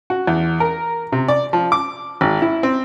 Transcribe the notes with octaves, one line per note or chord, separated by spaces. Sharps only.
F#4
E2
A#4
C3
D5
F3
D6
G#1
E4
C4